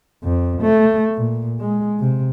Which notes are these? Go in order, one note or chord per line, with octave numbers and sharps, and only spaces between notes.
F2
A3
A#2
G#3
C3